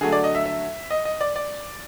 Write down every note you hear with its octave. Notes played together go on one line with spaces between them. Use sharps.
D3 F#3 A3 G#4
D5
D#5
E5
E5
D#5
D#5
D5
D5